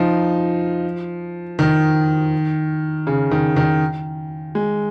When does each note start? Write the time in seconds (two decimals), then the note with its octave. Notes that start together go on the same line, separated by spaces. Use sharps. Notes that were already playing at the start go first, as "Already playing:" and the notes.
Already playing: F3 D#4 F4
1.59 D#3
3.07 C#3
3.31 D#3
3.56 D#3
4.55 G#3